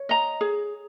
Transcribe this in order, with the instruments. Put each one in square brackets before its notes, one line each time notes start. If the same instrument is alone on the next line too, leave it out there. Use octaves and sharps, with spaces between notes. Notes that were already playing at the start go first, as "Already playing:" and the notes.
Already playing: [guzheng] C#5
[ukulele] D#5 A#5
G#4